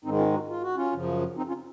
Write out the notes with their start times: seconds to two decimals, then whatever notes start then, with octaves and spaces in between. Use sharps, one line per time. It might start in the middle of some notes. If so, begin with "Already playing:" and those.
0.05 G#2 D#3 G#3 C4 D#4
0.19 C#4 F4
0.33 D#4 F#4
0.49 F4
0.62 F#4
0.75 C#4 F4
0.93 F#2 C#3 F3
1.37 C4 D#4
1.47 C#4 F4